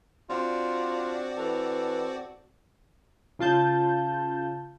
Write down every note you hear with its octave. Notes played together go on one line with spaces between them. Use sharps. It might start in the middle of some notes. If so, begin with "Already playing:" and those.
C4 D4 F4 F#4 D5
E3 A4
C#3 F4 A5 G6